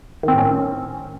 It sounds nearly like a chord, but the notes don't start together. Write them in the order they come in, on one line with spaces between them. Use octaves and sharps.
D#3 C4 A2 C#4